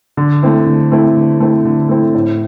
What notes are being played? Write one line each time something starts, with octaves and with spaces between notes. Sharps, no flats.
D3
A3 C4 E4
D3
A3 C4 E4
D3
A3 C4 E4
D3
A3 C4 E4
A2